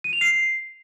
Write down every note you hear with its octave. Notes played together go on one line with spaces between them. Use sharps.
D#7
F7
C7